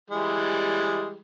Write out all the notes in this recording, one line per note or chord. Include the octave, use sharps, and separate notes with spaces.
E3 G3 G#3